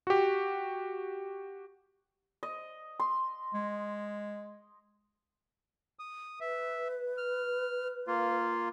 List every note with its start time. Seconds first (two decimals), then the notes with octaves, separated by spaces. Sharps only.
0.07 F#4 G4
2.43 D#5
3.00 C6
3.54 G#3
5.99 D#6
6.40 B4 E5
7.17 F6
8.07 A#3 F4